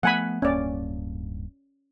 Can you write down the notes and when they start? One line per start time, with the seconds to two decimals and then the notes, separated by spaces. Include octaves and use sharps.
0.03 F3 A3 B3 F#5 G#5 B5
0.42 D1 G2 A#3 C#4 D5